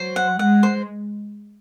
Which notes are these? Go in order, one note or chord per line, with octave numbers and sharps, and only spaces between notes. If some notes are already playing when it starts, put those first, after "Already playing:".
Already playing: F#3 C5
F#5
G#3 F#5
C5